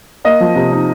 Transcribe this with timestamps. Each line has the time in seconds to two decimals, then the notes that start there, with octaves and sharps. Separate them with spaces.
0.24 A#3 D#5
0.41 F3
0.55 C3
0.72 D#4